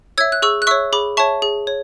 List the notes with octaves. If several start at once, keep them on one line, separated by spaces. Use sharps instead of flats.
C#5 E5 E6 G#6
F#6
G#4 C#6 E6
F#6
C#5 E5 C#6 E6
G#4 B5 D6
C#5 E5 A5 C#6
G#4
C#5